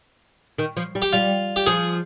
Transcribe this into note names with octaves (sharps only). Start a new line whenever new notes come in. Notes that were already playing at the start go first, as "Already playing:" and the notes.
D#3
F3
G3
G4
G3 F4
G4
F3 G#4